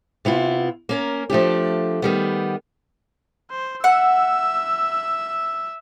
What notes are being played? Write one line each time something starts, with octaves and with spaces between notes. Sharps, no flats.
C3 B3 E4 F4
A#3 C#4 A#4
F3 A3 D4 G4
D#3 G3 B3
C5
E5 F#5 E6